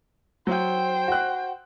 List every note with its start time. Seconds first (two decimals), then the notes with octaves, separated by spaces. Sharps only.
0.47 F#3 C5 G5
1.08 F#4 F#6